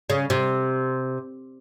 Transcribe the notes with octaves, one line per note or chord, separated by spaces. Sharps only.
C#3
C3